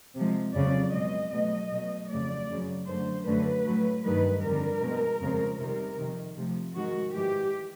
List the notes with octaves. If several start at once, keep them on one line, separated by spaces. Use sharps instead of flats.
C3 F3 G#3
F2 C#3 F#3 D5
B2 G#3 D#5
B2 F#3 A3 D#5
B2 F#3 A3
F2 C#3 F#3 A3 D5
F#2 C#3 F#3
F#2 D3 F#3 A3 C5
F#2 D3 F#3 A3 B4
A2 F#3 A3
G2 D#3 G3 B4
F2 D3 G3 A#4
B2 G#3
F2 C#3 F3 G#3
C3 D#3 G3 A#4
F2 C3 D#3
C3 F3 A3
G#2 D#3 G#3 F#4
G#2 E3 G#3 G4